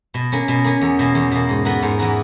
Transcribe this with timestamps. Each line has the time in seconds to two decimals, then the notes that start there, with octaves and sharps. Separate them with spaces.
0.14 B2
0.32 A#3 C#4
0.48 B2
0.64 A#3 C#4
0.81 E2
0.99 B2 A#3
1.15 E2
1.32 B2 A#3
1.49 G#2
1.65 E3 B3 F#4 A#4
1.82 G#2
1.99 E3 B3 F#4 A#4